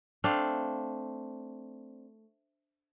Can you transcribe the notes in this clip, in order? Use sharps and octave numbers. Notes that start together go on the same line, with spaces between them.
A3 C4 D4 F5